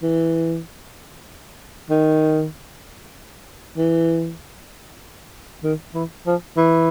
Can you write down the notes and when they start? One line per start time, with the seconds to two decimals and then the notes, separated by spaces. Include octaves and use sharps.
0.03 E3
1.90 D#3
3.77 E3
5.64 D#3
5.94 E3
6.26 F3
6.57 E3